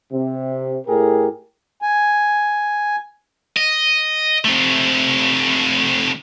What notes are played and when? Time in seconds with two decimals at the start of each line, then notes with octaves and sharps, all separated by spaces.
0.13 C3
0.87 A2 G4 G#4 A#4
1.82 G#5
3.56 D#5
4.45 C3 A3